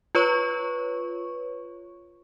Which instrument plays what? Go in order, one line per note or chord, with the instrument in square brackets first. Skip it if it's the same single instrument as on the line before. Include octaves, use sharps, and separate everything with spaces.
[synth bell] F4 B4 C#5 C#6